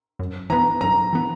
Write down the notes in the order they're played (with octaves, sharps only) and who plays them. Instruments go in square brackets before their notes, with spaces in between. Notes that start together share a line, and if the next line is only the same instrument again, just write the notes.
[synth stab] F#2
[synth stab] E3 B3 [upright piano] A#5
[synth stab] F#2 [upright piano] A#5
[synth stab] E3 B3